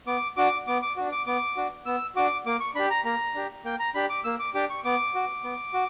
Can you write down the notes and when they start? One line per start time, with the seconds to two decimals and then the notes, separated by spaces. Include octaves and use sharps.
0.07 B3 D6
0.37 D4 F#4 D6
0.67 B3 D6
0.82 D6
0.97 D4 F#4
1.12 D6
1.26 B3 D6
1.56 D4 F#4
1.86 B3 E6
2.15 D4 F#4 D6
2.46 A#3 D6
2.60 C#6
2.75 D4 G4 B5
2.90 A#5
3.05 A#3 A#5
3.35 D4 G4
3.64 A#3 G5
3.79 A#5
3.94 D4 G4 B5
4.10 D6
4.24 A#3 E6
4.40 D6
4.54 D4 G4 D6
4.70 C#6
4.85 B3 D6
5.15 F#4
5.44 B3
5.73 F#4